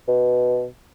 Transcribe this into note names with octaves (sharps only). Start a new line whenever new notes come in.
B2